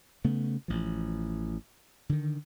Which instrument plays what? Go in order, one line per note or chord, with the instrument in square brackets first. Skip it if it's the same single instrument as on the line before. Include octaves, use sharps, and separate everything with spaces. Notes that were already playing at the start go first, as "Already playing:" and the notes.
[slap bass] C#3 A3 B3
A1 F3
D3 D#3